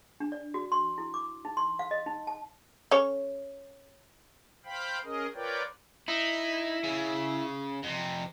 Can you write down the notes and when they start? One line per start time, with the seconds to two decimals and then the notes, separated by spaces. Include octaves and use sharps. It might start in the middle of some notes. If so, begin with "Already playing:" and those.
0.20 D4
0.32 D5
0.54 F#4
0.72 C6
0.98 E4
1.14 D6
1.45 D#4
1.57 C6
1.79 F5
1.91 D#5
2.06 D#4
2.27 A5
2.91 C#4 A4 C#5
4.65 C5 F5 G5 B5
5.04 C#4 G#4 A#4 D#5
5.34 F4 A#4 B4 C#5 D5 G5
6.08 D#4 E4
6.84 C#3
7.83 F2 C3